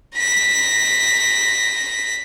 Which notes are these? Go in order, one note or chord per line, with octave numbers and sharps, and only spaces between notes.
A#6 B6